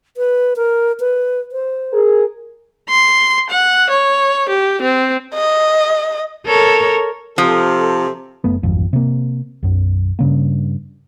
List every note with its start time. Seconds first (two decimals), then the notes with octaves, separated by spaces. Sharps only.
0.17 B4
0.56 A#4
1.00 B4
1.52 C5
1.92 G#4 A#4
2.89 C6
3.50 F#5
3.90 C#5
4.49 G4
4.81 C4
5.34 D#5
6.46 A4 A#4 C#5
7.38 C3 F3 A4
8.44 F#1 A3 B3
8.63 D1 G#1 F2
8.93 C3 A#3
9.63 B1 F#2
10.19 G2 C#3 A#3